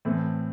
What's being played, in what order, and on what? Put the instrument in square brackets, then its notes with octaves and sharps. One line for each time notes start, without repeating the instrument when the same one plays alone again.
[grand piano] A2 E3 A3 C4